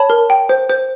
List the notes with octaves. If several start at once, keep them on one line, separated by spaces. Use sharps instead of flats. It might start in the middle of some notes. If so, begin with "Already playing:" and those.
Already playing: C#5 A5 B5
A#4
G5
C5
C5